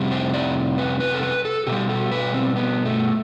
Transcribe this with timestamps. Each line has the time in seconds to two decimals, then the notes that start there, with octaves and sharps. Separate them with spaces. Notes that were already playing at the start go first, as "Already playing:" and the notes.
Already playing: F2 C3 G3
0.11 C5
0.34 D5
0.78 B4
1.00 B4
1.14 A4
1.23 B4
1.45 A4
1.67 B2 G3 G4
1.89 A4
2.12 B4
2.34 C4
2.56 B3
2.85 A3